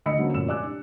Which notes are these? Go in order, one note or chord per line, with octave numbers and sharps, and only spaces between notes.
D2 D#5 B5 E6 C#7
D3 F#3 A#3 C4 C#4
F1 F#2 A#2 E6 E7
G4 D5 G#5 D6 E6 F#6
D4